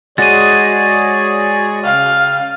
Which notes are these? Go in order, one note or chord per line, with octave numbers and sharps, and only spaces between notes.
G#3 F#4 G#4 C#5 D5 A6 D#7
C#3 F5 G5